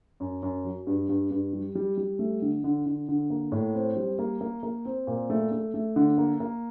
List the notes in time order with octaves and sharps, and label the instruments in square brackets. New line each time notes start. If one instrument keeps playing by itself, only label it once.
[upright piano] F#2
F#2
F#3
G2
G2
G2
G3
G3
G3
A3
D3
D3
D3
D3
A#3
A2
C4
G3
A#3
A#3
A#3
C4
A#2
A3
A3
A3
D3
A#3
A#3